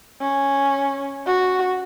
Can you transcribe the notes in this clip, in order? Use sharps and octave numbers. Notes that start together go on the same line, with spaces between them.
C#4
F#4